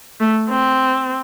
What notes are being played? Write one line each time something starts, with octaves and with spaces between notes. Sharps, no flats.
A3
C4